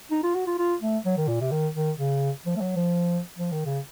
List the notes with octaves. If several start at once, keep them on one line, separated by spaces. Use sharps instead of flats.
D#4
F4
F#4
F4
F4
A3
F#3
D#3
A#2
C3
D#3
D#3
C#3
F3
A3
F#3
F3
F3
D#3
C#3